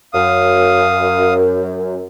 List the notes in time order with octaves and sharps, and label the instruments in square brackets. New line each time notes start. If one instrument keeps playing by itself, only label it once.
[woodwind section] F#2 [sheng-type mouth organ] F5 D#6